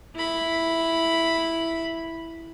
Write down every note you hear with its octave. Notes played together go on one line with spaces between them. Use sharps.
E4 B5